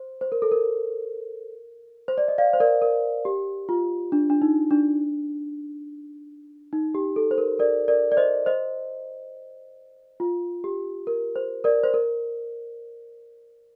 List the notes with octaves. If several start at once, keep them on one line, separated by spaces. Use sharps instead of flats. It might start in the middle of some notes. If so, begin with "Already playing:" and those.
Already playing: C5
C5
A#4
A4
A#4
C5
D5
D#5
D5 F5
C5
A#4 D5
A#4
G4
F4
D4
D4
D#4
D4
D#4
G4
A4
C5
A#4
A#4 D5
A#4 D5
D5
C5 D#5
C5 D#5
F4
G4
A#4
C5
A#4 D5
C5
A#4